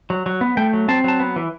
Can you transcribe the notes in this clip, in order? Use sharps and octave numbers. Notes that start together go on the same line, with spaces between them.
F#3
F#3
B3
A3 G5
F#3
C4 A5
F#3 A5
B3
E3